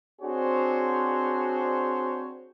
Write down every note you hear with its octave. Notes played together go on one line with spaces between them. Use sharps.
C4 D4 F#4 G#4 C5 C#5